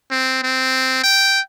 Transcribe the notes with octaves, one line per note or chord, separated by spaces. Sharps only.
C4
C4
G5